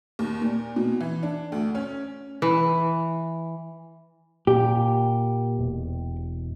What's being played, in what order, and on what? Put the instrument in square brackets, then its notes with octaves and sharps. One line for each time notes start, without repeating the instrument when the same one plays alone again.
[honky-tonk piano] D#2
A#2
B2
E3
D4
D2
C#4
[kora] E3
[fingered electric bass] A#2 [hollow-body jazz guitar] G4
[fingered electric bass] E1